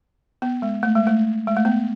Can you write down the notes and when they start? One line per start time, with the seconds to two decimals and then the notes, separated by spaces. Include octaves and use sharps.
0.42 B3
0.62 G#3
0.83 A3
0.95 G#3
1.07 A3
1.47 G#3
1.56 A3
1.65 B3